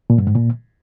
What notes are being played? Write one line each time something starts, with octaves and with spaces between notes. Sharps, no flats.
A#2
G2
G#2
A#2